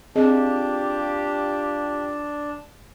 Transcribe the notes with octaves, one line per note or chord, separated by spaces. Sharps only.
C4 D4 F4 G4 G#4 D#5